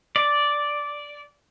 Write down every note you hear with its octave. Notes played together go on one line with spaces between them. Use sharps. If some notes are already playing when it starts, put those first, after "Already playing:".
D5